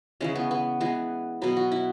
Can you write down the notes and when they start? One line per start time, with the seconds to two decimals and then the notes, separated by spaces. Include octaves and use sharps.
0.21 C#3 E3 G#3 C#4
0.36 B3
0.51 B3
0.80 E3 G#3 B3
1.42 B2 F#3 B3
1.57 F#4
1.72 E4